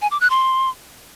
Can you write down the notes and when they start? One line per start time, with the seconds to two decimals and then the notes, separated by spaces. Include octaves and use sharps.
0.02 G#5
0.11 D6
0.21 F#6
0.30 C6